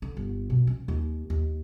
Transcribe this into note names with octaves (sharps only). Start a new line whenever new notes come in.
D3
G1
B2
C#4
D#2
D#2